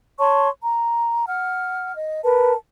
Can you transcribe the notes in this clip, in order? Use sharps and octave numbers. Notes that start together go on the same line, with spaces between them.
C#5 A5 C6 C#6
A#5
F#5 F6
D#5
A#4 B4 A5